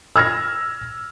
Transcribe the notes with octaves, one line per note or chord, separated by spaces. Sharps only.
E6 F6 G#6 A#6